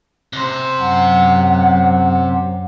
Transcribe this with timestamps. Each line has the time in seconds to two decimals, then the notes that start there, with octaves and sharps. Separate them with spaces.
0.33 C3 C5
0.80 F#2 F#5